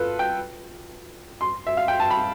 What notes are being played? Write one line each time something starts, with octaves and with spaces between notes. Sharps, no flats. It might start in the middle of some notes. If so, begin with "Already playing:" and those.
Already playing: F4 A4 B4
G5
C6
E5
F5
G5
A5
B5